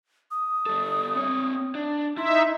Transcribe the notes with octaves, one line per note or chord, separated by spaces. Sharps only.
D#6
G3 A4
C4 C#5
D4
D#4 E4 E5 C6